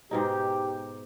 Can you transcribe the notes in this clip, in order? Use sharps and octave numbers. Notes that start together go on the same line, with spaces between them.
G#2 B2 D#4 G4